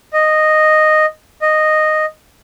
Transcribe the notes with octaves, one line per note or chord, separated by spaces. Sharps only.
D#5
D#5